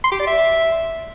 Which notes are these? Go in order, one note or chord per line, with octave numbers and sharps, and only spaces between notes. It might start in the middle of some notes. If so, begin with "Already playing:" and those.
C6
G4
D5
E5